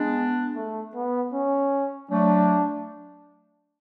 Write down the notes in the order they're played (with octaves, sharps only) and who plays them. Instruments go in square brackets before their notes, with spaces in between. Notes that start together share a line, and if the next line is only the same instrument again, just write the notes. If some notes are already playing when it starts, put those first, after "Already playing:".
Already playing: [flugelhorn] G#3 [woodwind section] B3 D4
[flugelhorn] A3
B3
C#4
[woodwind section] F#3 A3 [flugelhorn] D4